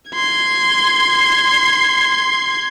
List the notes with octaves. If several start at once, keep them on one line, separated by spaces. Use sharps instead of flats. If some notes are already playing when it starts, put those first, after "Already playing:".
C6 G#6